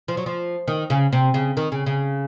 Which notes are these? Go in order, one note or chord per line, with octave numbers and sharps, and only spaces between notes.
F3
F#3
F3
D#3
C#3
C3
C#3
D#3
C#3
C#3